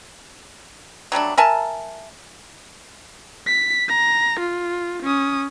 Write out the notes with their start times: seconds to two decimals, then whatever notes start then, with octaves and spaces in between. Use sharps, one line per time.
1.12 F#3 G3 A3 D4
1.38 A#4 E5 G#5 A5
3.46 B6
3.88 A#5
4.40 F4
5.03 C#4 D#6